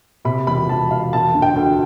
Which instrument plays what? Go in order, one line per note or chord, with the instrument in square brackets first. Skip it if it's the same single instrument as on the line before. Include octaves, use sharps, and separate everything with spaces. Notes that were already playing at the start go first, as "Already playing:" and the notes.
[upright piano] C3 B5
E1 B5
E1 A5
E1 F5
E1 A5
D3
G5
D2